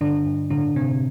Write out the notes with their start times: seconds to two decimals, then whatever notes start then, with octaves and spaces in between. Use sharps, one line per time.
0.01 G2 D3 D4
0.26 G2
0.50 A2 D3 D4
0.76 A2 C3 C4